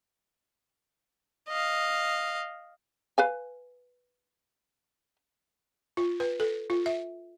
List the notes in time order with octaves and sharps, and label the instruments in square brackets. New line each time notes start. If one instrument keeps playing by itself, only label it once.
[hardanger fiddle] D#5 F5
[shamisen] B4 F5 G#5
[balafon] F4
B4
A4
F4
E5